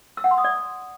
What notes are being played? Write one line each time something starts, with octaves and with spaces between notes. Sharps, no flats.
E6
F#5
C6
D#6
D5